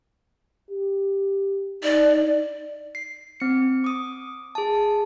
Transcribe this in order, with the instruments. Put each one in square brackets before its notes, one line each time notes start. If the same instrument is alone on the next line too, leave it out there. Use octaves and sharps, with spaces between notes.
[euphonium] G4
[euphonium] D#4 [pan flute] D5
[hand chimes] C7
C4 C#7
D6 D#6
G#4 A5